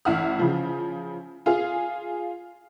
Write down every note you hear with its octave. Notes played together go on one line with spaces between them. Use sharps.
A1 E4 F#5 F6
C#3 F3
F4 G#4 F5